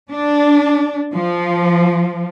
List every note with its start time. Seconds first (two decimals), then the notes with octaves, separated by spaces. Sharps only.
0.11 D4
1.14 F3